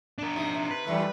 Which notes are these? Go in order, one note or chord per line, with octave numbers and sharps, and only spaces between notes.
D4 A#4
C3 D#4
C3
B4
F#2 E3 G3 A3